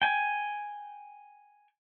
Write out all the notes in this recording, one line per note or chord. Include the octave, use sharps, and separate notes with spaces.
G5 G#5